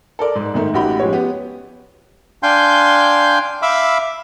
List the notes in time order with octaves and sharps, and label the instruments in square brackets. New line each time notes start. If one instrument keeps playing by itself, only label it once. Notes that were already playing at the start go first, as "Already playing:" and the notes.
[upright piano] A4 A#4 D5
G#2
G#2 D#3 A3
A1 D#4 F#4 G4 B5
F3 G#3 C#4 G4 C#5
B3 G4
[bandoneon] D4 F5 G5 G#5 C6 G6
E5 F5 B5 D6 E6